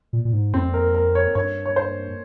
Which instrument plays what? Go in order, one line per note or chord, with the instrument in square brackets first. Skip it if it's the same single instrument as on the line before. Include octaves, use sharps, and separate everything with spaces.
[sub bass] A#2
A#2
G#2
[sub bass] F2 [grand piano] C4
[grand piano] A#4
A#4
C#5
[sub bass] G2 [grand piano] C#5
[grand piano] C#5
C5